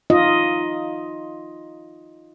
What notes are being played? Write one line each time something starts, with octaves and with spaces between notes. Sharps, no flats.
D#4 F4 D#5